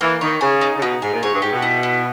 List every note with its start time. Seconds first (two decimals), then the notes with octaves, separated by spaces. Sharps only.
0.01 E3 A#3
0.21 D#3 C#5
0.41 C#3 G#4
0.61 D#4
0.76 C#3
0.81 B2 D#4
1.02 G#2 G#5
1.13 A#2
1.22 G#2 C#5
1.33 G2
1.42 G#2 G4
1.52 B2
1.62 E4
1.83 E4